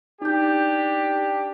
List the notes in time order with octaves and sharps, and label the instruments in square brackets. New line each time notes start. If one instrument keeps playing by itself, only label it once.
[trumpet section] D4 G4 [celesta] D#4 G6